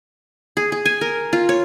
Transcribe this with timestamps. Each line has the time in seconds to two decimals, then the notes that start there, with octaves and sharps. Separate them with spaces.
0.57 G#4
0.72 G#4
0.85 G#5
1.01 A#4
1.33 F4
1.49 C#5